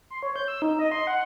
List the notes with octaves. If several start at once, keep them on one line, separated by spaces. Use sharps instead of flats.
C6
C#5
G6
E6
D#4
D#5
C6
F#5